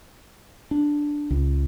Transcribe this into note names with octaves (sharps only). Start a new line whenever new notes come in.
D4
C#2